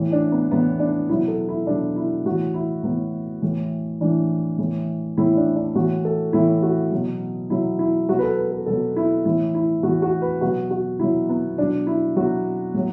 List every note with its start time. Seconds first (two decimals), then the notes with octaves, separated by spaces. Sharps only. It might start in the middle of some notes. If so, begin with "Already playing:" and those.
Already playing: A2 E3
0.12 D4
0.32 B3
0.51 A2 E3 B3
0.80 D4
1.10 B2 F#3 E4
1.28 A4
1.49 E4
1.67 B2 F#3 D4
1.96 E4
2.26 A2 F#4
2.30 E3
2.54 E4
2.83 A2 E3 B3
3.42 A2 E3
4.01 A2 E3 D4
4.58 A2 E3
5.17 A2 E3 E4
5.37 D4
5.56 D4
5.75 A2 E3 F#4
6.05 A4
6.33 A2 E3 E4
6.62 F#4
6.92 B2 F#3
7.50 B2 F#3 E4
7.79 E4
8.09 B2 F#3 F#4
8.19 B4
8.23 A4
8.37 B4
8.52 A4
8.66 B2 F#3 A4
8.96 E4
9.25 A2 E3 E4
9.55 E4
9.83 A2 F#4
9.86 E3
10.02 F#4
10.22 B4
10.41 B2 F#3 F#4
10.71 F#4
10.99 B2 F#3 E4
11.29 B3
11.58 B2 F#3 D4
11.87 E4
12.16 B2 F#3 F#4
12.74 A2 F#3